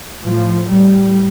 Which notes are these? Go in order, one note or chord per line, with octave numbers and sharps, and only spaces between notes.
A2 F3
A2 G3